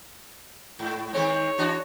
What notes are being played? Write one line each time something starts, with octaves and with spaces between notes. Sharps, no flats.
G#2
D#3 G#3 C4 C#5
E3 D4 F#4